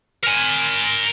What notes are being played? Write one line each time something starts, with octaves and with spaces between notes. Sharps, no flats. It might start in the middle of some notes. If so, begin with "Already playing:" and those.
A#4 G#5